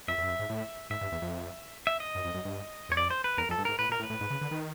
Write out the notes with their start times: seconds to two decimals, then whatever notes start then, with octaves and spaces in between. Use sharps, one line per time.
0.08 F2 E5
0.18 E2
0.23 F#2
0.29 F2
0.39 G#2
0.50 A2
0.90 G#2 E5
1.01 G2
1.12 E2
1.22 F2
1.87 E5
2.00 D#5
2.15 F#2
2.25 F2
2.34 F#2
2.45 G2
2.89 E2
2.92 C#5
2.97 F2 D5
3.10 C5
3.24 B4
3.37 E2 A#4
3.49 F2 A4
3.58 G2
3.65 G#2 A#4
3.79 A2 B4
3.89 A#2
3.92 A#4
4.00 A2
4.03 B4
4.10 A2
4.21 G#2
4.30 C#3
4.41 D3
4.51 D#3